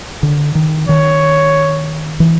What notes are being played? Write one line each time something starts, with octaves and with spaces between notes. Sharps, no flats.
D3
D#3
D#3 C#5
E3